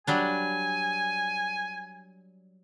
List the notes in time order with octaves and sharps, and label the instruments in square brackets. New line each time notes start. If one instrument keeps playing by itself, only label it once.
[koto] F#3 G3 D4 [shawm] G#5